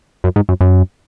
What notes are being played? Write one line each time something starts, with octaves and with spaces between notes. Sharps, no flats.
F#2
G#2
F#2
F#2